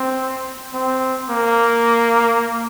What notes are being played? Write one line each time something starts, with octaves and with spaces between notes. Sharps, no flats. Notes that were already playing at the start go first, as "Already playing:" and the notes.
Already playing: C4
C4
A#3